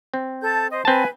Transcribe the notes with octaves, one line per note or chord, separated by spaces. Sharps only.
C4
A4 A5 G6
C5 D#5
C4 B4 G#5 A5 B5